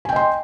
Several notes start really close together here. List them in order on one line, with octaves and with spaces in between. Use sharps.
G#5 G5 D#5 C6